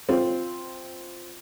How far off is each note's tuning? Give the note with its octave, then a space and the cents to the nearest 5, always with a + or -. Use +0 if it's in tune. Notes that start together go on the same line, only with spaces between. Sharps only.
C4 +0 F4 +0